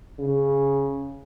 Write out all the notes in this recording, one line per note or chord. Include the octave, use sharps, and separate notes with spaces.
C#3